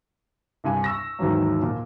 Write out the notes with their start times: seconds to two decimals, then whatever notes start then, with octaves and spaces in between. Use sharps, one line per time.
0.64 C2 G2 G#5
0.84 C#6 E6 A#6
1.19 D#2 G#2 D#3 E3 F#3 A#3
1.62 A#2